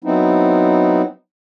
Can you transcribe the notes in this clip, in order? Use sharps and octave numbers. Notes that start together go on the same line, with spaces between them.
F#3 B3 C4 D#4 E4